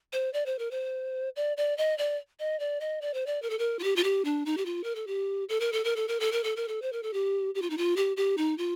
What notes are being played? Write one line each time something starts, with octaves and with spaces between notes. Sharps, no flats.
C5
D5
C5
A#4
C5
D5
D5
D#5
D5
D#5
D5
D#5
D5
C5
D5
A#4
A4
A#4
F4
G4
F4
G4
D4
D#4
G4
F4
A#4
A4
G4
A4
A#4
A4
A#4
A4
A#4
A4
A#4
A4
A#4
A4
C5
A#4
A4
G4
G4
F4
D#4
F4
G4
G4
D#4
F4